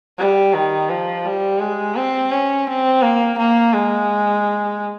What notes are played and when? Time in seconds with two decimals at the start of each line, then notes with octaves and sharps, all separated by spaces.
0.19 G3
0.54 D#3
0.90 F3
1.25 G3
1.61 G#3
1.96 C4
2.32 C#4
2.68 C4
3.02 A#3
3.38 A#3
3.74 G#3